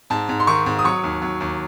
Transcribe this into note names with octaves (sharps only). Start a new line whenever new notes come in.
G#2 A5
G#2
C6
D#3 C#6
G#2
D#6
F#3 C#6
D#2
F#3
D#2